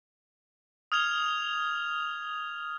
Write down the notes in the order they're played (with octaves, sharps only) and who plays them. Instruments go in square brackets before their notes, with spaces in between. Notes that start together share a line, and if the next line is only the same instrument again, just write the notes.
[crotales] D#6 F6 G#6 F7